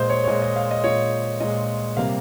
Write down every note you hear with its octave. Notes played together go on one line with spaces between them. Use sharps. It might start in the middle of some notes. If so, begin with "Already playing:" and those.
Already playing: A#2 G#3 C5 D#5
C#5
C#5
A#2 G#3 D#5
D#5
F5
D#5
A#2 G#3 C#5
A#2 G#3 D#5
C3 G3 A#3 F5